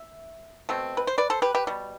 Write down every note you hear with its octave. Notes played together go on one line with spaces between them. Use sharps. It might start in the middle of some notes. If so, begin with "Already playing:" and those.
Already playing: E5
B2 A3 C4
B4
C5
B4 D5
A4 C5
G4 B4
G4 B4
B2 G3